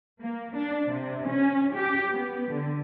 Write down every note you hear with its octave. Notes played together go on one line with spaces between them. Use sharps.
A#3
D4
C3
C#4
G4
B3
D3